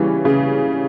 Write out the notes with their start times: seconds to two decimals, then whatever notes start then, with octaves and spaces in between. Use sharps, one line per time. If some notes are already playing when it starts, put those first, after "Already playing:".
Already playing: C#3 E3 G3 C#4
0.25 C#3